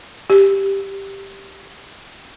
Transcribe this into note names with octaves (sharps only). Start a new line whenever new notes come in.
G4